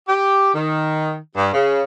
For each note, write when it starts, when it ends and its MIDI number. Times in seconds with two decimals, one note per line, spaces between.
0.07 0.52 67
0.53 1.15 51
1.35 1.50 43
1.53 1.81 49